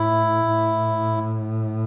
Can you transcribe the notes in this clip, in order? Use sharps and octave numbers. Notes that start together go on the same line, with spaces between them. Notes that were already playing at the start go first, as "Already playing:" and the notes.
Already playing: A2 E4
A2